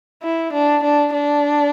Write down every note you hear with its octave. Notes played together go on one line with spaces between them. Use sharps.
E4
D4
D4
D4